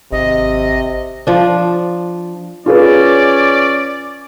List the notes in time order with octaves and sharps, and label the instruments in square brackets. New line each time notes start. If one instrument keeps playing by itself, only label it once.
[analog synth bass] G#1 [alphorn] C3 [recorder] D#5
[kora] F3 D4
[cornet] C#4 [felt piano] F4 G#4 B4 [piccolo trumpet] D5